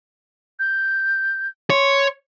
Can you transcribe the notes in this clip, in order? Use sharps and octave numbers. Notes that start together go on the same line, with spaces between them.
G6
C#5 C6